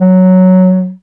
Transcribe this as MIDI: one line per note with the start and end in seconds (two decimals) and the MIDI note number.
0.01 0.91 54